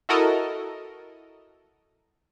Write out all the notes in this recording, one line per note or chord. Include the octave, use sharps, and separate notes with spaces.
E4 F#4 A4 A#4 D#5